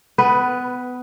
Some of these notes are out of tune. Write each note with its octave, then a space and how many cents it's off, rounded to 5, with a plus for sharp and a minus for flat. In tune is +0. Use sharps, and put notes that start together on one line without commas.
B3 +20 B4 +0